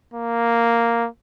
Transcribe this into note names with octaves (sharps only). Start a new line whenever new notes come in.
A#3